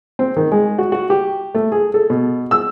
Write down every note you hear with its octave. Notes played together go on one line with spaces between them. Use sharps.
C4
D#3
G#3
F#4
F#4
G4
A3
G#4
A4
B2
E6